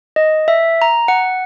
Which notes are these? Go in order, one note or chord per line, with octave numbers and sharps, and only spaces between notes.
D#5
E5
A#5
F#5